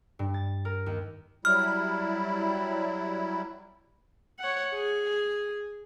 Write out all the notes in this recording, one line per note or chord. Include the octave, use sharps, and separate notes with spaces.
G2
A6
A#4
D#2
F#3 G3 E4 F6
C#5 F#5
G#4